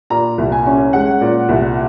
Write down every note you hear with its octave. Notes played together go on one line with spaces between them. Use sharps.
A#2 A#5
C2
G#5
C#4
G#3 F#5
A#2
C2